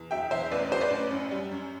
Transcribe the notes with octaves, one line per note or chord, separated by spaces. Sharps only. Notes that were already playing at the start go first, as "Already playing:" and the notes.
Already playing: E2
F#3 E5 G5
E2 C5 E5
A1 B4 D5
F#3 C5
B4 D5
A1
F#2
G3
F#2